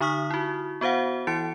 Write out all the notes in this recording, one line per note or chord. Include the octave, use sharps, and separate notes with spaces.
D3 D#4 C#6 D#6 F6 B6
E4 F#4
B3 F#4 C5 F5 F#5
E3 E4 A6 C#7 D7